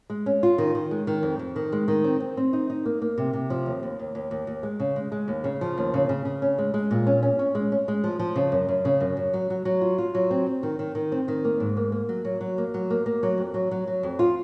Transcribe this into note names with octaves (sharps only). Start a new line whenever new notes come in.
G#3
C#4
F4
D#3
D#3
G#3
D#3
F2
F2
D#3
G#3
D#3
C4
C4
C4
D#4
D#4
A#3
A#3
C3
C3
F3
D#2
D#2
D#2
D#2
D#2
D#2
G#3
C#3
G#3
G#3
D#2
C#3
F3
D#2
C#3
C#3
C#3
C#4
G#3
G#3
A#2
C#4
C#4
C#4
G#3
C#4
G#3
F3
F3
C#3
F#2
F#2
C#3
F#2
F#2
F#3
F#3
F#3
F4
F4
F#3
C4
C4
D#3
D#3
D#3
C4
D#3
A#3
G#2
A#3
A#3
F#3
F#3
F#3
A#3
F#3
A#3
A#3
F#3
F2
F#3
F#3
F#3
F2
F4